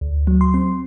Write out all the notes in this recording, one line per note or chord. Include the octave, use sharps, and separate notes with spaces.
D2
F#3
C6
C4